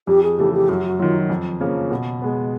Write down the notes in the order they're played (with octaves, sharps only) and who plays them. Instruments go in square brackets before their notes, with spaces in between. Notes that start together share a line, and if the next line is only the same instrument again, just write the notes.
[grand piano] F2 [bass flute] G4
[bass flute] G#4
[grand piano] C#3 E3 A3 [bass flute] G4
[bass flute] G4
[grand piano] F#2 [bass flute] F#4
[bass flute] F#4
[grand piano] D#3 F#3 [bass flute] F4
[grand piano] F2
C#3 F3 A#3 C#4
B2
G#3 B3